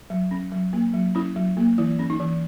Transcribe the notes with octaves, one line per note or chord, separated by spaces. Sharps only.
F#3
C#4
F#3
A#3
F#3
C#4 E4
F#3
A#3
E3 E4
C#4
D#4
E3